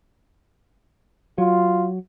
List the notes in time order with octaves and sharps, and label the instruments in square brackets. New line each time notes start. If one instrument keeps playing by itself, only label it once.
[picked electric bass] F#3 [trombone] F4